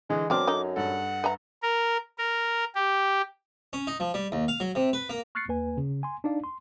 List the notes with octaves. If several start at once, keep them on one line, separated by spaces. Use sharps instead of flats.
D3 E3 G#3
F#2 F#3 B3 C4 D4 D6 F6
D3 D#4
G2 A4 F#5
B4 E5 A#5
A#4
A#4
G4
C#4
D#4
F3
G3
D#2
F5
F#3
C3
B4
A#3
C#6 F6 F#6 A6 C7 C#7
D#2 A#3 B4 G#5
C#3
G#5 C6
D4 D#4 D5 F5
C6